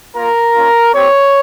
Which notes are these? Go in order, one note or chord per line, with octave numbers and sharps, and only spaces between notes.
A#3 F4 A#4
A#3 C#4 F4
C4 G4 C#5